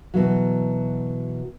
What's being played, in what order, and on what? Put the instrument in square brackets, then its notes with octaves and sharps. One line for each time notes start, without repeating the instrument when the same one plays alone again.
[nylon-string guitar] B2 E3 F#3